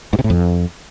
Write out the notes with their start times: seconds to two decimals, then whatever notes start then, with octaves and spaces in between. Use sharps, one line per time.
0.13 G#2
0.19 C3
0.24 A2
0.30 F2